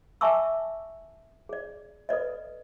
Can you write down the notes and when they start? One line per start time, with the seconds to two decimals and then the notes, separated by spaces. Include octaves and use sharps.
0.21 E5 G#5 A5 C#6 D6 E6
1.49 G#4 D5
2.09 A4 B4 D5 D#5